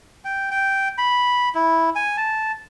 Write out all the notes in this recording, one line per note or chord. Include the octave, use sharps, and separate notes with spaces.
G5
G5
B5
E4
G#5
A5